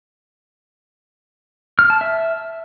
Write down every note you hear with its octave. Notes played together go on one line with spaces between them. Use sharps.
F6
A5
E5